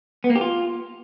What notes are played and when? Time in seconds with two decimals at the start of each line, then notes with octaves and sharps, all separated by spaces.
0.24 B3
0.30 A#3
0.35 G4
0.41 F4